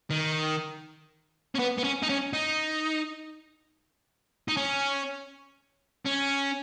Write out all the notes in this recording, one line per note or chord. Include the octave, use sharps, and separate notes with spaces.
D#3
C#4
B3
B3
C#4
D#4
C#4
D#4
D#4
C#4
C#4